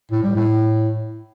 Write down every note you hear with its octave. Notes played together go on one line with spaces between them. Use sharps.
A2
G3
A2